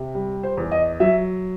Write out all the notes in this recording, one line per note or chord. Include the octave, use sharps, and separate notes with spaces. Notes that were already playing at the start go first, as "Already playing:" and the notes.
Already playing: C3
G3
C5
E2
D#5
F#3 E5